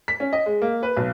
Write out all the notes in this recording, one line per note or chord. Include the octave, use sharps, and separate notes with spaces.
B6
C#4
D#5
G#3
A#3
B4
B1